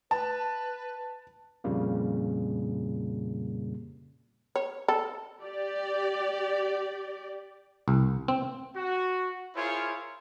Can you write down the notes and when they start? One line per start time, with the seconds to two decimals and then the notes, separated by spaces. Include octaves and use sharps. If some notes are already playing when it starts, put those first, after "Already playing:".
0.11 B4 A5
1.64 F2 A#2 C#3 G3 A#3
4.56 C#5
4.88 A4
5.43 G4 D5
7.88 C2
8.28 C4
8.76 F#4
9.55 E4 F4 G#4 A#4 C5 C#5